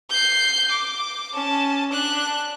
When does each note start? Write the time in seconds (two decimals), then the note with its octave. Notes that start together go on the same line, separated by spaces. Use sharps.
0.10 G6 C7
0.71 D6
1.34 C#4 A5
1.92 D4 F#6